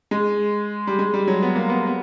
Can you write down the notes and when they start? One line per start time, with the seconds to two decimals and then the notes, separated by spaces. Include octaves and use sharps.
0.11 G#3
0.87 G3
0.99 G#3
1.14 G3
1.28 F#3
1.42 B3
1.56 A#3
1.69 B3
1.87 B3